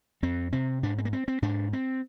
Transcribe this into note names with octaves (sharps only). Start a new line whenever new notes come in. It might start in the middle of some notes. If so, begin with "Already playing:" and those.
F2 C4
C3 C4
G#2 D4
C4
A#3
C4
C4
G#2 D4
C4